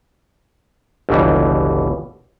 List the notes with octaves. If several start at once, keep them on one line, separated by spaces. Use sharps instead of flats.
G1 C#2 B2 E3 G3